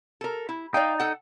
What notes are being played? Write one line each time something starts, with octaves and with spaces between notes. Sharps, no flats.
A4 A#4
E4
D#4 D5 F5 G5
A4 F#5